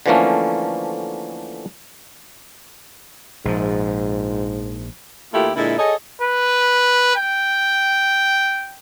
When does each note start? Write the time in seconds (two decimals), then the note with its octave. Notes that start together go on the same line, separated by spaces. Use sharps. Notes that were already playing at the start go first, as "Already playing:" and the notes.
0.06 D3 E3 F3 A3 A#3 C#4
3.45 A#1 G#2 F3
5.33 D#2 A3 A#3 E4 F4 G4
5.56 A#2 D3 G#3 E4
5.78 G#4 A4 C#5 D#5
6.21 B4
7.16 G5